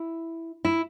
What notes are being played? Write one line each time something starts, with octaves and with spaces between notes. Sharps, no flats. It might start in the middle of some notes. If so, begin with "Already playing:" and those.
Already playing: E4
E4